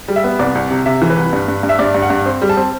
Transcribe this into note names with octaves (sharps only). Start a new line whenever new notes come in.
G3
E5
B3
C2 D5
C2
C3
C3 E5
E3
B4
C2
G2
G2
G2
E5
G2 D5
G2
F#5
G2
C4
G3
A5
C4